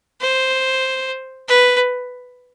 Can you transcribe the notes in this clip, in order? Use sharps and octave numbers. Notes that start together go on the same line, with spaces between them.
C5
B4